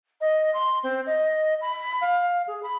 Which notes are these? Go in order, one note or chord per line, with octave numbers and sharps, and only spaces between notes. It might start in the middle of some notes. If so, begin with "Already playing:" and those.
D#5
C6
C4
D#5
B5
F5
G#4
B5